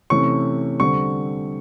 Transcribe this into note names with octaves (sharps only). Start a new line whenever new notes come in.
C3 E3 A3 C#4 C#6
D3 G3 C4 C#6